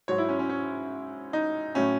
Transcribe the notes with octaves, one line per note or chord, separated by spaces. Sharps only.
G#2 F#3 C#5
E4
C#4
C#4
C#4
D#4
A2 F#3 C#4